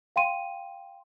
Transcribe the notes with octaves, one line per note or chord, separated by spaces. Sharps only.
F5 G5 C6 D#7